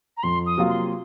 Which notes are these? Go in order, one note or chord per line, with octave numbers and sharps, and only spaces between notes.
A#5
F2 C6
D#6
C3 F#3 A#3 F4
C6